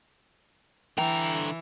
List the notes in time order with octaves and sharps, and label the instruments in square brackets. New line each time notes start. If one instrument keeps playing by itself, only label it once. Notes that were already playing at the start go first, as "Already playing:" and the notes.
[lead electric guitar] D3 A#5 [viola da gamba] E3 [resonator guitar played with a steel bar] G5